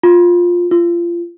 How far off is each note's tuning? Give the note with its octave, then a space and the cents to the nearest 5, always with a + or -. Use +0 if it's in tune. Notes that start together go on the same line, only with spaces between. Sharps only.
F4 +10
F4 -25